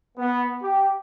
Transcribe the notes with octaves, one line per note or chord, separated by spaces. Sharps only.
B3
G4